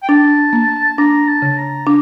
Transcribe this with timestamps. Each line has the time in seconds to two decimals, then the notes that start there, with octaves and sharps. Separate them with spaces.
0.03 G5
0.09 D4 A5
0.53 A#3
0.98 D4 A#5
1.28 A5
1.42 C#3
1.57 A#5
1.87 D4